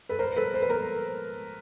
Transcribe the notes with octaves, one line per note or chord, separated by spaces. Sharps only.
A4 B4
A#4 C5
A4 B4
C5
B4
A#4 C5